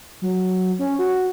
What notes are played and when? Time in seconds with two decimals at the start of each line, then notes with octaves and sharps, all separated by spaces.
0.22 F#3
0.79 C#4
0.99 F#4